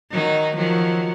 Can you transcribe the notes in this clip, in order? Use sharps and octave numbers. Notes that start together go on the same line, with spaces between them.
D#3 F#3 D#4
D#3 F3 F#3